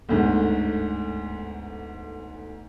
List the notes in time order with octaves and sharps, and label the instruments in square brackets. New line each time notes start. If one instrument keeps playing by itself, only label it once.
[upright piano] G1 D2 G#2